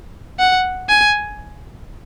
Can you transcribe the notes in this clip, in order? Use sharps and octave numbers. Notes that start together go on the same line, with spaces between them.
F#5
G#5